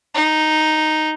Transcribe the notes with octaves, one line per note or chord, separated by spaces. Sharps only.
D#4